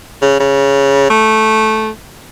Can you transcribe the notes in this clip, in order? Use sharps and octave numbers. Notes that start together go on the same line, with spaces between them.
C#3
C#3
A3